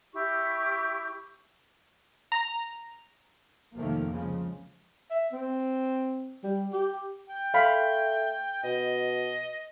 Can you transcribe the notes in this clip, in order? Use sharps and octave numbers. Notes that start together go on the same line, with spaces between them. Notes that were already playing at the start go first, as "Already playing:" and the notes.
E4 G4 C#6
A#5
C2 F2 D#3 F3 A3 A#3
C#3 F3 G#3
E5
C4
G3
G4
G5
A3 F5 B5
B2 D#5